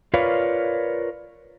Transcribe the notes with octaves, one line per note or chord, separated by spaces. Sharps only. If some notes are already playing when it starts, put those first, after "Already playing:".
F4 A#4 B4 C#5 D5 F5